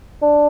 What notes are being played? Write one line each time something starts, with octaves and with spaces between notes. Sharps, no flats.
D4